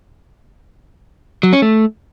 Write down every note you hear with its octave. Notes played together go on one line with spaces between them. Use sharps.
F#3
C#4
A3